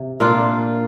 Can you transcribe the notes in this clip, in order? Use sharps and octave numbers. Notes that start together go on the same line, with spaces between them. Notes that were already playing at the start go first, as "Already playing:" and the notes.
Already playing: C3
A#2 A#3 D4 F4